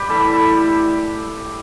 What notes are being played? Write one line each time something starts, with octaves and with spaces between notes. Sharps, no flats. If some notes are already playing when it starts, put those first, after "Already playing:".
Already playing: G4 B4 D5
A2 E3 G3 A4
A4
G4